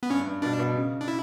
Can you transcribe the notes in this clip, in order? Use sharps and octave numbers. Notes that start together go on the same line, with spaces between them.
B3
G2 C#4
G2
B2 D4
B2
C#3
D4
E4